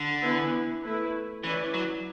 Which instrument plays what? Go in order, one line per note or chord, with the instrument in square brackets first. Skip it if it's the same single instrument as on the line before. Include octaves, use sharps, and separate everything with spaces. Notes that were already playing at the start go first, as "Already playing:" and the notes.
Already playing: [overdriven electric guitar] D3
[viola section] E3 B3 E4 B4
A3 E4 B4
[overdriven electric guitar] E3 [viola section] C#4 E4 B4 D5
[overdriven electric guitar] F#3